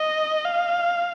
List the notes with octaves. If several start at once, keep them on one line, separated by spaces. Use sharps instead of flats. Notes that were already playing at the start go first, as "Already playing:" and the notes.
Already playing: D#5
F5